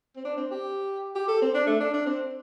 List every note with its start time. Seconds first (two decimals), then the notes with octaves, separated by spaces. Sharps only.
0.16 C4
0.25 D4
0.37 C4
0.51 G4
1.15 G4
1.28 A4
1.42 C4
1.54 D4
1.67 A3
1.80 D4
1.94 D4
2.06 C4